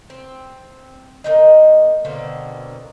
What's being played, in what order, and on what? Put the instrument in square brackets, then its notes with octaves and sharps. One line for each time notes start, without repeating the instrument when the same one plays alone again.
[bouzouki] C4
A#3 C#4 D#4 D#5
B2 D3 A#3 C4